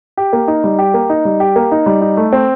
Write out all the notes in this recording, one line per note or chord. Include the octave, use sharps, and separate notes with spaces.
G4
A#3
D#4
G3
G4
A#3
D#4
G3
G4
A#3
D#4
G3
D#4
A3
C4